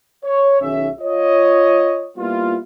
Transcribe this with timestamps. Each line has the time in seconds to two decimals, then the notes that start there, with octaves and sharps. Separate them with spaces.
0.24 C#5
0.61 B1 D#3 C#4 G#4 C#5 E5
1.01 F4 C#5 D#5
2.17 G3 A#3 B3 E4 F4